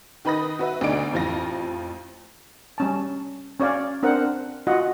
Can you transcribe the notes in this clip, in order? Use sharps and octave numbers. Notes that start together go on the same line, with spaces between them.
D#3 D#4 B4 B5 D#6 A#6
F#4 B4 E5
D2 B2 D3 D#4 D5 D7
A1 F2 E3 F3 F4 A#6
G3 C#4 A5
C#4 C#5 D5 F5
C4 D4 A#4 C5 F#5
F4 F#4 D#5 F#5